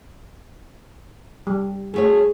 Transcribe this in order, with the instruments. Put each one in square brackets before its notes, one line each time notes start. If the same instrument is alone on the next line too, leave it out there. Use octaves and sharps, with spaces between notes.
[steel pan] G3
[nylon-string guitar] D2 A3 C#5 [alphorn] G#4